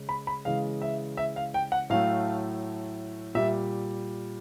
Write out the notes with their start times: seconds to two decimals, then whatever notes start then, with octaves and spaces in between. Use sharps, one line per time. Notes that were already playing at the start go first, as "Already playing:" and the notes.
Already playing: C#3 G#3
0.09 B5
0.27 B5
0.45 C#3 E3 G#3 F5
0.82 E5
1.17 E5
1.36 F5
1.54 G5
1.72 F#5
1.90 A2 F#3 A3 F5
3.35 A#2 G3 E5